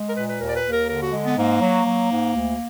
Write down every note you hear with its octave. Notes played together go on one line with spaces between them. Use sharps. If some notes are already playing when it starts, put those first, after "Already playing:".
Already playing: G#3
A#4
A#2 B4
B4
D#2 A#4
D5
B4
D#2
A#4
D3 A#4
F#4
G#3
B3
G#2 A#3
F#3
F#3
G#2
D2